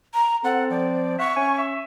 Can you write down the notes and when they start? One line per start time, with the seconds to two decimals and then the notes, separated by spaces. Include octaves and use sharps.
0.14 A#5
0.44 C4 A4 F#5
0.70 F3 D5
1.19 E5 F#5 C#6
1.37 C#4 G#5
1.58 E5